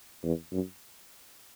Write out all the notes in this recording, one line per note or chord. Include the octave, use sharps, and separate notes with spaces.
E2
F#2